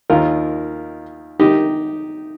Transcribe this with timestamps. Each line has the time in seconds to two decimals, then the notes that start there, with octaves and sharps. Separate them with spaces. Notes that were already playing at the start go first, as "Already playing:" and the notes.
0.10 D#2 D#3 F4 A#4
1.40 D#3 D#4 G4